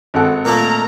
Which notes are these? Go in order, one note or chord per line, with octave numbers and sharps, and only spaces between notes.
G#1 A4 F#5
A#2 A3 A#3 A#5